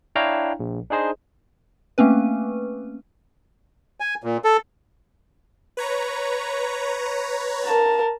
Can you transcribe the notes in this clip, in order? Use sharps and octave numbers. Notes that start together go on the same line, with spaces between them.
D4 E4 C#5 F5 G5 A#5
A#1
D4 D#4 G#4 C5 D#5
A3 A#3 C4 C#4 B4
G#5
A#2
A4
B4 C#5 A#5
A#4 A5